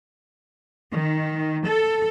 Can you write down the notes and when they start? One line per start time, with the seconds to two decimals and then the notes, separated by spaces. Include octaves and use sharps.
0.91 D#3
1.66 A4